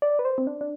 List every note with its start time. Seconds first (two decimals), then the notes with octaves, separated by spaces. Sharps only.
0.02 D5
0.19 B4
0.25 C5
0.38 C4
0.47 D4
0.61 D4